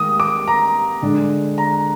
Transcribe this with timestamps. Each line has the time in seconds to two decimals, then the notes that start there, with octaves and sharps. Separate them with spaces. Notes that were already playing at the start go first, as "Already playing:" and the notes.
Already playing: D#2 G#3 D#6
0.20 D6
0.47 A#5
1.02 D3 G#3 D4
1.58 A#5